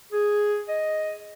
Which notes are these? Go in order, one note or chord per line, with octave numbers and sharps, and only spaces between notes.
G#4
D#5